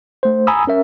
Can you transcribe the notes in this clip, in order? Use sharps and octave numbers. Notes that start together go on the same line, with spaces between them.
A3 C5
G#5 A#5 B5 D#6 E6
C#4 A#4 E5